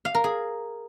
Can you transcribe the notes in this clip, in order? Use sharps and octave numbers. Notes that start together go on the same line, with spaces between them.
F5
A#4
G#4